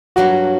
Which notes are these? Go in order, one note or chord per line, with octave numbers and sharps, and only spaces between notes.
G2 F#3 A#3 F#4